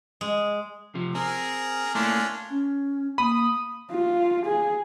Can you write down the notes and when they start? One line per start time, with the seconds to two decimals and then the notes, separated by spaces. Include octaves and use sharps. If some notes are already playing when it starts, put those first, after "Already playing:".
0.21 G#3
0.95 C3 F3
1.15 C4 G#4 A#4
1.95 A3 A#3 C#4 D4 E4 F4
2.50 C#4
3.18 A#3 B5 D#6
3.92 F4
4.46 G#4